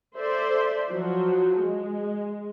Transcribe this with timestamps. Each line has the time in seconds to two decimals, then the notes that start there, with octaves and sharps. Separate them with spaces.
0.18 A4 C5 D5 E5
0.89 F3 F#3 F#4
1.60 G#3